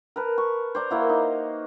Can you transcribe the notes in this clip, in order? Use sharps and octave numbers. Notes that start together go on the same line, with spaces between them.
A#4 B4 A5
C#6
C5 D5 A#5
A#3 E4 F#4
D#4